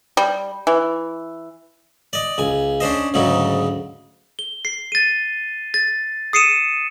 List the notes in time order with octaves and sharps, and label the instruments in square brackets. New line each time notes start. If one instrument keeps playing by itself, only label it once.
[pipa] G3
E3
[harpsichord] D5 D#5
C#2 G#5
C#4 D4 C5 D#5
D2 G#2 C#3 F#3 D#4
[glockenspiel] G7
C7
A6 D#7
A6
D#6 C7 C#7 D#7 E7